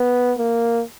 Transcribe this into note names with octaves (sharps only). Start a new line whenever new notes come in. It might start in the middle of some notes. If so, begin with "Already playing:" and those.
Already playing: B3
A#3